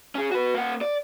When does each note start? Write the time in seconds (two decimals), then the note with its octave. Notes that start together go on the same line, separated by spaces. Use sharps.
0.15 C#4 G#4
0.31 F#4 B4
0.54 A#3 F#5
0.81 D5